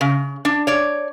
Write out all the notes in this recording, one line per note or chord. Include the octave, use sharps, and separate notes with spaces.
C#3
D4
C#5 D5